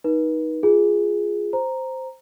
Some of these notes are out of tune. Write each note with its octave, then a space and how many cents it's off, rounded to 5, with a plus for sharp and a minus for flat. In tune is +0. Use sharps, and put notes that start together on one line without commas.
D#4 +10 B4 -35
F4 +0 G#4 +0
C5 +0 A#5 +0